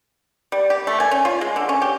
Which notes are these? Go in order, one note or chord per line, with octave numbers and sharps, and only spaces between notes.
G3
G4
A3
G#5
C#4
F4
G#3
D3
C#4
G4